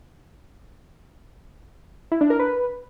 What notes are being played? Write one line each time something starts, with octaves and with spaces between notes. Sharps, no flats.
E4
D4
A#4
B4